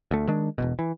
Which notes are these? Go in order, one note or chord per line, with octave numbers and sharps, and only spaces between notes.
D2 A3
D#3 G#3 D4
E1 C2 B2
E3